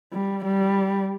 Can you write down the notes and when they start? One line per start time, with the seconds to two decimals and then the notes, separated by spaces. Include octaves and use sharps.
0.13 G3
0.45 G3